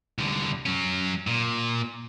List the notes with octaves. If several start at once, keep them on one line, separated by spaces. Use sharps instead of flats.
C2 D3
F#3 C#4
A#2